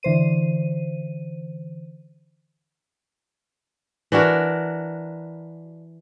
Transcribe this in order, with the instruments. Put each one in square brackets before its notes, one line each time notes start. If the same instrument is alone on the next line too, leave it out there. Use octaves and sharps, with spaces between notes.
[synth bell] D3 E3 C5 D#7
[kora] E3 D4 F#4 A#4